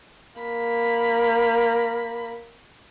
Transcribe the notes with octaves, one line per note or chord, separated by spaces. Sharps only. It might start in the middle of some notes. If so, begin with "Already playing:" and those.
A#3 B5